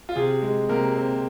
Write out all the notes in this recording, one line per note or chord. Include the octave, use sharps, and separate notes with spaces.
F4
C3 G#4
G#3
C3 A#3 A#4
C4